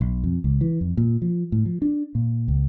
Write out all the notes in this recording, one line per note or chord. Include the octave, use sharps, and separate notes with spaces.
B1
F2
C#2
E3
F2
A#2
F3
A2
F3
D4
A#2
C#2